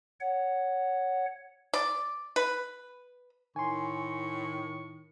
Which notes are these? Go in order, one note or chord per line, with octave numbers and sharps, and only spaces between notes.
C#5 F#5
D5
B4
A2 D#3 G#5 C6 C#6